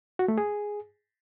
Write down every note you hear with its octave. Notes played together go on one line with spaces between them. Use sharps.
F#4
A3
G#4